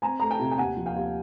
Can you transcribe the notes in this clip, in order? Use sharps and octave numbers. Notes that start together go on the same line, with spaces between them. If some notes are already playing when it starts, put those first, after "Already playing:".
C4 G#5 A#5
A3 A#5
G5 A5
C3
G5
D#2 F#5 G#5
F3
F5 G5
D#2